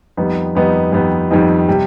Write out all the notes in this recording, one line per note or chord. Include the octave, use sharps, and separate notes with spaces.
F2 D#3 G3 B3 D#4
F2 D#3 G3 B3 D#4
F2 D#3 G3 B3 D#4
F2 D#3 G3 B3 D#4
C3 G3